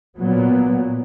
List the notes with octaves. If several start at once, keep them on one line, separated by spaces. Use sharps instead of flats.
A#2 F#3 B3